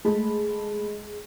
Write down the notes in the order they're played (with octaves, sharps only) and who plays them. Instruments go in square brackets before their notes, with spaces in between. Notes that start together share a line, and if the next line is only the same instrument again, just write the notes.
[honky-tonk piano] G#3 [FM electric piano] A3 A5 B5